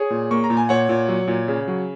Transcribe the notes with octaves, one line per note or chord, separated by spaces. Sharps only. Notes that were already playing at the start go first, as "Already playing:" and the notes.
Already playing: G#4 C#5
A#2
A#3 C#6
A#5
A#2
G#5
A#2 C#5 F#5
A#2
F#3
A#2
C#3
F#3